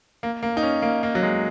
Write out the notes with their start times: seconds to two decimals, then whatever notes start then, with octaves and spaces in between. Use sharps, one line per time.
0.23 A#3
0.43 A#3
0.57 D#4
0.62 C#4
0.82 A#3
1.03 A#3
1.15 F#3
1.23 G#3